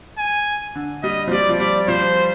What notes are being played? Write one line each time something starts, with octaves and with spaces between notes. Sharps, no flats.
G#5
D3
G3 D#5
F3
G3 D5
F3
G3 D5
F3 C5